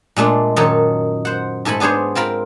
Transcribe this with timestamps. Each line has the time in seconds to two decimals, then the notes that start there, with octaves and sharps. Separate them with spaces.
0.16 A#2 G#3 A3 D4
0.56 F#2 A#2 D#3 D#4 A4 C#5
1.25 C5 F#5
1.65 G#2 A3 A4 G#5 B5
1.80 B3 D4 G#4 C5 C#5
2.15 C4 F4 A#4 B5